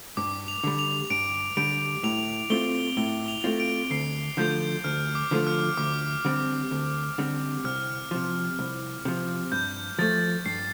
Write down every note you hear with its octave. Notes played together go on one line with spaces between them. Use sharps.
G2 D6
F7
D3 G3
F7
G2 D7
D3 G3 D7
A2 F7
A3 C4 F4 G7
A2 G7
F7
A3 C4 F4
D7
D2 C7
D3 F3 A3 F4 G6
D2 F6
D6
D3 F3 A3 F4
F6
D2 D6
D3 G3 C4
D2
D3 G3 C4
C2 F6
C3 F3
C2
C3 F3
G2 G6
F3 A3 A6
G2 C7